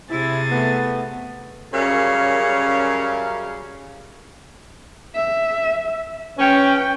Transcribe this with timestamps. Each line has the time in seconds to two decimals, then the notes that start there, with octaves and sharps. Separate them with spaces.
0.11 C3 E4 G#4 A6
0.51 A3 B3
1.73 F#2 C#3 G3 C#4 A#4 F5
5.15 E5
6.38 C#4 B4 G5